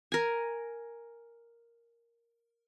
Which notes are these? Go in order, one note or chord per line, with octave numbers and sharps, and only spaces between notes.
A#4 G#5